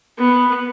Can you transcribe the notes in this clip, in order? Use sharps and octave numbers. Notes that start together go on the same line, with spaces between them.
B3